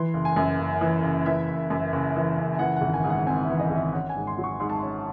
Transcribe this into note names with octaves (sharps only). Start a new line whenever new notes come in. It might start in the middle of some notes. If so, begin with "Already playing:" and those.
Already playing: E3 C6
F#1
G#5
F#2
F#1
E3
F#1
E3 E5
F#1
F#2
F#1
E3
F#1
G#5
E3 F#5
F#5
G#1
G#5
G#2
F#5
C4 G#5
E5
E3
D#5
G#1
E5
C#4 F#5
G#5
G#2
C6
F#3
C#6
G#2 C6
A5
C#4 C6